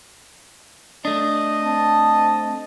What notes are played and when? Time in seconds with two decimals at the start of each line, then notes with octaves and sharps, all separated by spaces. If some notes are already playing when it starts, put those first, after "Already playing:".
1.05 A3 D4 D#5
1.64 C4 A5